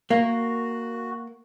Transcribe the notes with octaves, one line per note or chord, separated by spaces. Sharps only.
A#3 F#4